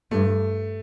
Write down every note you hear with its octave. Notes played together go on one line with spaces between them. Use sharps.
G2 A3